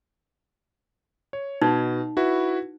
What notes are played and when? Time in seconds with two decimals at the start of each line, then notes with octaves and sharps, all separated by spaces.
1.33 C#5
1.62 B2 D#4
2.17 E4 F#4 B4